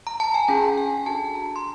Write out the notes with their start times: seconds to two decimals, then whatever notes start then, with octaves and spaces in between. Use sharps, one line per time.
0.07 A#5
0.20 A5
0.34 G#5
0.48 C#4 F4 G#4 G5
0.77 G#5
1.06 D4 F#4 A4 A5
1.35 A#5
1.56 C6